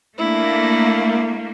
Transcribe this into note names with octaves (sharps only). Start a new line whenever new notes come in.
A3 A#3 D4 E4